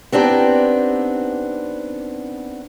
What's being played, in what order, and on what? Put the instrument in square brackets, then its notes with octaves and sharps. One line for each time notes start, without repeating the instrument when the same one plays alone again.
[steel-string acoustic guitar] B3 C4 D4 D#4 G4